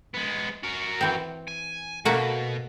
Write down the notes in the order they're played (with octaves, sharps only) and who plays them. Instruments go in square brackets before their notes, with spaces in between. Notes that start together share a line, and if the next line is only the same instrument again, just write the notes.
[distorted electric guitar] G#3 B3
F#4 A#4
[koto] E3 C4
[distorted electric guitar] G#5
[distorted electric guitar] B2 [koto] A3 A#3 F#4